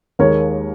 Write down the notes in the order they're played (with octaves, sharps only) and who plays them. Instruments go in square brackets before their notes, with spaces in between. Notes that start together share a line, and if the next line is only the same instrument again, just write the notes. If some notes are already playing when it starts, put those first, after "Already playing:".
[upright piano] D#2 D#3 G#3 A#4 C#5